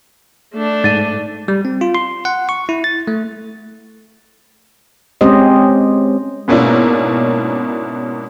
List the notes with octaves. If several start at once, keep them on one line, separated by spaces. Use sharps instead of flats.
A3 D4
G#2 A6 D#7
G3
C4
F4
C6
F#5
C#6
E4
A6
A3
G#3 C4 C#4 G4 C5 D#5
G#2 B2 A#3 C#4 D4 E4